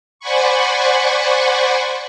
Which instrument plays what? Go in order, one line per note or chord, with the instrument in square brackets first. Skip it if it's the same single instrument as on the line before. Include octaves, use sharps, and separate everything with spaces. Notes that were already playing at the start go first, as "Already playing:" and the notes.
[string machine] C5 D5 F#5 G#5 B5 C#6